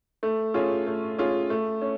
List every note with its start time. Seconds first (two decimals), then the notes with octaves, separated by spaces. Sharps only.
0.23 A3
0.54 C#4 F4 G#4
0.87 A3
1.18 C#4 F4 G#4
1.50 A3
1.82 C#4